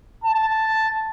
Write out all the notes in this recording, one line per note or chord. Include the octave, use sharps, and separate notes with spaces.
A5